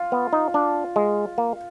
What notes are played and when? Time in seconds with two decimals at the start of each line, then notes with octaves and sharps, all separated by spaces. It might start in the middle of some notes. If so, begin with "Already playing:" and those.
Already playing: F4
0.12 B3
0.33 D#4
0.54 D4
0.96 G#3
1.38 A#3